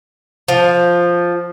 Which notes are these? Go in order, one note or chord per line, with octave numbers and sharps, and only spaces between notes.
F3